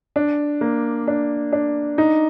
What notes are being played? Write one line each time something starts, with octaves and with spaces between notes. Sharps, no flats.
D4
A#3
D4
D4
D#4